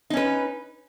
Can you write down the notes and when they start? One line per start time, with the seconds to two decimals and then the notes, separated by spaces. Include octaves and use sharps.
0.10 D#4
0.14 C#4
0.17 B4